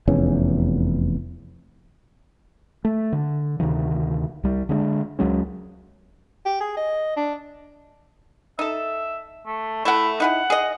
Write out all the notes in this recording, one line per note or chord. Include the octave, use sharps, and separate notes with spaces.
F1 E2 C#4
A3
D3
D2 C3 D#3 E3
C2 G3
D3 G#3 B3 D4
C#2 F#3 G#3 C#4
G4
G#4
D#5
D4
D#4 A4 E5
A3
A3 E4 F#5
D#4 E4 G#4 F#5
G#4 D#5